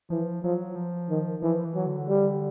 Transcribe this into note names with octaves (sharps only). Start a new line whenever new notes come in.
E3 F3
F3 F#3
F3
D#3
E3 F3
E3
F#3
D3
G3